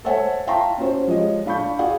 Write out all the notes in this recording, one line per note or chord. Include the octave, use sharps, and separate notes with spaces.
A4 C5 C#5 E5 F#5 G#5
E5 F5 G5 A5 A#5 C6
C#4 F#4 C5
F3 G3 G#3 C#5 D#5
D4 F5 B5 C#6 G6
F#4 G#4 D5 F5 F#5